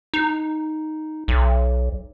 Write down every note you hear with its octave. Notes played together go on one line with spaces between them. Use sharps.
D#4
B1